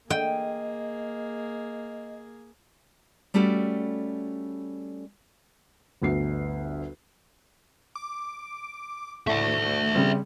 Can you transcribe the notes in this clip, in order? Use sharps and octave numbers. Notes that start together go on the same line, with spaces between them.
A#3 G#4 D#5 G5
G3 A3 C#4 F#4 G4 A4
G1 D2 C7
D6
A2 A3 D5 E5
C#3 G3 C4